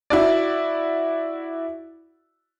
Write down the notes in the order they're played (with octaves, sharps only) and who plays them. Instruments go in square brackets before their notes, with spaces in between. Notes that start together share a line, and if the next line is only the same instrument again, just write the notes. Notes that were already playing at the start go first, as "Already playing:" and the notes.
[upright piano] E4 F#4 D5